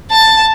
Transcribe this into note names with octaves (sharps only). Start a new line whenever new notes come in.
A5